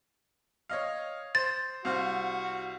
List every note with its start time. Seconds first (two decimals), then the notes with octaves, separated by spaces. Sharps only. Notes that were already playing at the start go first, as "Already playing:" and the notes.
0.70 C#5 D#5 F5
1.35 C5 A6
1.85 C2 F#4 C5 F5